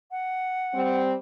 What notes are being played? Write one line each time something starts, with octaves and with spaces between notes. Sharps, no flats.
F#5
G3 C4